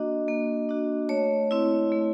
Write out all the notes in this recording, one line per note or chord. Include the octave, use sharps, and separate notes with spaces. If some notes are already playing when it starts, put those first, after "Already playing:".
Already playing: A#3 D4 F#4 D#5
A#3
D4 F#4
A3 C#5
C4 E4
A3